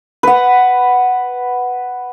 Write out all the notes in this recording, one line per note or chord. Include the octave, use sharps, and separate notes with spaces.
B4 F#5